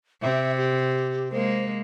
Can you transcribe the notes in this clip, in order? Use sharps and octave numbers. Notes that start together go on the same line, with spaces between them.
C3 E5
G4
G#3 A#3 C5